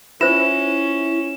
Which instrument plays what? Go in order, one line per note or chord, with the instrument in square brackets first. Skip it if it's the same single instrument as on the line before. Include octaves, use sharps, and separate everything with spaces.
[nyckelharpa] C#4 [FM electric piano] E4 [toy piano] F4 C5 [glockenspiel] E7